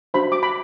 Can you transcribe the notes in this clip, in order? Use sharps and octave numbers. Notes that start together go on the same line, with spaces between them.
D4 F#4 C5 B5
D6
B5